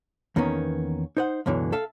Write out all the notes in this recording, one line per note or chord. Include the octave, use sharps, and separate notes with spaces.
E2 D#3 A#3 B3 C#4
D#4 C5 F#5
C#2 F#2 B2 D3 E3
A4 E5 F5